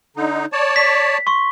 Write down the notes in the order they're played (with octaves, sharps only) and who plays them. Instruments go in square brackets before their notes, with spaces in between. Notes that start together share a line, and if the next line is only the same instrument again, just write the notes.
[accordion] D3 D#4
C#5 D5 A5
[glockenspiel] B6
C6 C#6